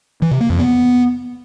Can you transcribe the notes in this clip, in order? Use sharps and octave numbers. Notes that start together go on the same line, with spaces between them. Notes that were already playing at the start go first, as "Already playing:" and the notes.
E3
C3
A#3
F2
B3